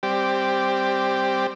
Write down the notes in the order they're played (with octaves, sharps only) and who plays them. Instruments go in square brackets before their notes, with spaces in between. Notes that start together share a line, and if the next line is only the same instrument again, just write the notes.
[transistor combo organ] G3 C4 G4 D5